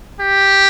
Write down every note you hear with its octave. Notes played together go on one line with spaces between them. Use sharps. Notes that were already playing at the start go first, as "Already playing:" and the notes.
G4